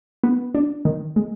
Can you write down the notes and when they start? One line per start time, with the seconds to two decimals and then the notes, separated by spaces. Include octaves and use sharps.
0.24 B3
0.55 D4
0.85 D#3
1.16 G#3